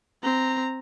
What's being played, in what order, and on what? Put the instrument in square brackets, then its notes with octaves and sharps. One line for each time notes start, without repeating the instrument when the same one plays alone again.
[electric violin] C4 A#5